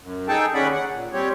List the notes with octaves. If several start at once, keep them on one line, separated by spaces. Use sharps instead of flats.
F#2
D#4 G#4 A4 G5 A5
D#2 C#4 G#4 D5 F#5 B5
F#5
A#2
G3 C4 G4 C#5